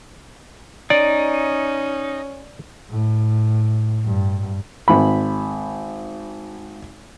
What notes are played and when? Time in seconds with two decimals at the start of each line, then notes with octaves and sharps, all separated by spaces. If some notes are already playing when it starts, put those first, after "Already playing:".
0.90 C#4 D#4 D5
2.90 A2
4.05 G2
4.88 G#1 B5